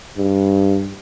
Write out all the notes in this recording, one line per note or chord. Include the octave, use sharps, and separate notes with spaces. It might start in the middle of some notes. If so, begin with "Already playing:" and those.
G2